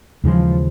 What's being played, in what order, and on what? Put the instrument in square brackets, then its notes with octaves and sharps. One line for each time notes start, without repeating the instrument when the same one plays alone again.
[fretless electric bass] D#2 C#3 E3 G#3 [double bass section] F3